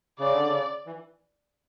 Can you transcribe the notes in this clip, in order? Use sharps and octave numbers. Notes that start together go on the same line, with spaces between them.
C#3 D5
D3
C#3
E3